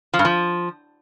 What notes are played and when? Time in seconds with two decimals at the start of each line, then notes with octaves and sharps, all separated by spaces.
0.14 F3
0.19 G2
0.25 F3